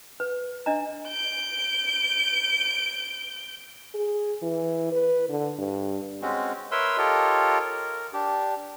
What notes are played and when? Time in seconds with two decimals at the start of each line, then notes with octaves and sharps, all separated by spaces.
0.20 B4
0.66 D4 D#5 A#5
1.08 G6 D7
3.94 G#4
4.42 E3
4.92 B4
5.30 D3
5.59 G2
6.22 G#3 C4 C#4 F#4
6.71 A#4 B4 C#5 E5 C6 E6
6.97 F4 G4 A4 A#4 C#5 D#5
7.60 A#4
8.13 D4 G4